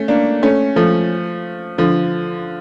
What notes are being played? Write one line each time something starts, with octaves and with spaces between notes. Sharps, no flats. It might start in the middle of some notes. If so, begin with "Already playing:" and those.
Already playing: A3 C#4
A#3 D4
A3 C#4
F3 A3
D3 F3